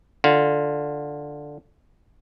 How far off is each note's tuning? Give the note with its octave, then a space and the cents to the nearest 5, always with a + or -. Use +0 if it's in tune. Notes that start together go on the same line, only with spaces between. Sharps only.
D3 +0 F4 +0